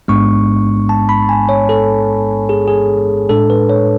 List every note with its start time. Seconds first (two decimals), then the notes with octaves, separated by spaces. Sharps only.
0.08 A1 G#2 G#3 B3 D4 C#6
0.89 A5
1.09 B5
1.29 G#5
1.49 C#5
1.69 A4
2.49 G#4
2.68 G#4
3.29 A2 G#3 D4 A4
3.50 B4
3.70 C#5